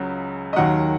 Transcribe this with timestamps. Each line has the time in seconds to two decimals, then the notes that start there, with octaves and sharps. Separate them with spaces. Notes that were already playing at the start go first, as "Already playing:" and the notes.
Already playing: C#2 C#3 F#3
0.53 D#5
0.56 D#2 D#3 F#3 F#5